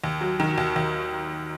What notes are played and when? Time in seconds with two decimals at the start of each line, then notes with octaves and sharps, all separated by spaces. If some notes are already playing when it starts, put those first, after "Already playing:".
0.04 D#2
0.21 F#3
0.40 D#3
0.58 D#2
0.76 D#2